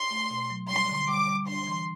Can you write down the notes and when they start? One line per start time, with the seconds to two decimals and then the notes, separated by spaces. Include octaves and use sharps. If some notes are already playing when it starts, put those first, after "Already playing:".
Already playing: C6
0.11 A3
0.31 B2
0.50 F#3
0.69 G3 C6
0.89 D3
1.09 G3 D6
1.28 G3
1.48 D4 C6
1.67 E3